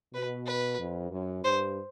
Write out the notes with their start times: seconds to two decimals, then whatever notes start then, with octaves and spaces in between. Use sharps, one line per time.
0.14 B2 B4
0.47 B4
0.79 F2
1.11 F#2
1.44 G2 C5